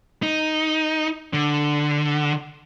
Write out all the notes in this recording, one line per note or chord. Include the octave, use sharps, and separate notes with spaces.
D#4
D3